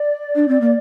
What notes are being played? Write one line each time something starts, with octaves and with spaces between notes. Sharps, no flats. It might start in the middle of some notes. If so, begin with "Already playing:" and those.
Already playing: D5
D4
C4
A#3